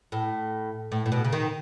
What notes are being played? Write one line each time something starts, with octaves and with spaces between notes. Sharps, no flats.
A2
A2
A2
B2
C#3
D#3